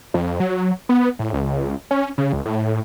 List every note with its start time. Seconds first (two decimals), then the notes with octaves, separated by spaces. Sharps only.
0.14 F2
0.40 F#3
0.89 B3
1.19 A2
1.33 C#2
1.91 C#4
2.18 C#3
2.33 C#2
2.45 A2